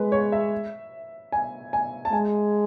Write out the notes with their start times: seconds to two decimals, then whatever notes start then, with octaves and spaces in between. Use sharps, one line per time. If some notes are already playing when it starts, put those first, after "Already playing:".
Already playing: G#3 B4
0.12 C#5
0.32 E5
1.32 G#5
1.73 G#5
2.05 A5
2.13 G#3 G#5